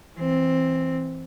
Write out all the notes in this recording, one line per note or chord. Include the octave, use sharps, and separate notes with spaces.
E3 C4